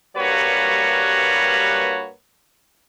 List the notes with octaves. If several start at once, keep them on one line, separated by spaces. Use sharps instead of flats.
G2 G3 A#3 F#4 B4 C#5